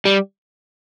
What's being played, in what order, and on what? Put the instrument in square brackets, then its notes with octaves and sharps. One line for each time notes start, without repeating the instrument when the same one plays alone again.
[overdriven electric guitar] G3